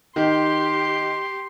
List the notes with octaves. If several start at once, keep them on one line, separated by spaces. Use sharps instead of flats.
D#3 G4 C6